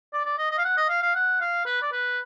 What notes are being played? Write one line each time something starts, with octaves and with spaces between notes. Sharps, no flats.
D5
D5
D#5
D#5
F5
F#5
D#5
F5
F5
F#5
F5
B4
D5
B4